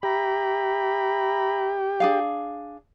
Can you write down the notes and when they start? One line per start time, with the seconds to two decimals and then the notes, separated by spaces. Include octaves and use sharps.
0.03 G4 E5 A#5 B5
2.00 D4 G#4 F5